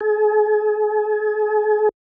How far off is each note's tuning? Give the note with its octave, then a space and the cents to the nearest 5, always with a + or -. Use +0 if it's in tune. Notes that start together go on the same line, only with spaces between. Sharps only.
G#4 +40